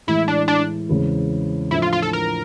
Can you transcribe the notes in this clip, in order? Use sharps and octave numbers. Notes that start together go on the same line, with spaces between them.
A2 E3 G#3 E4
D4
D4
E2 C#3 E3 G#3 C4
A2 F3 A3 D4 E4
F4
F4
A4
A#4